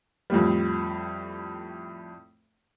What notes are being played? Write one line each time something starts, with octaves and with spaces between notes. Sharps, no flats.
F2 A2 G3